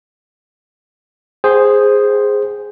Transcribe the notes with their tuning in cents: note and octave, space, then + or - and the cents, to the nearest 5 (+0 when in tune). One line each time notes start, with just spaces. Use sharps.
G#4 -5 C5 +0 G5 -40